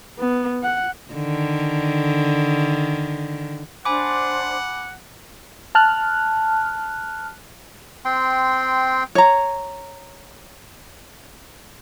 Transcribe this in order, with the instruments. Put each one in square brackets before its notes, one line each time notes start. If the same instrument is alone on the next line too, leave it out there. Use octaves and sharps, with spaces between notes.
[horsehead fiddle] B3
F#5
[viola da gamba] D3 D#3
[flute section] D4 C5 [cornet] F#5 [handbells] G#5 B5 D6
[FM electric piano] A5 F6 F#6
[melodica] C4 G5 C6
[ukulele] C#5 A#5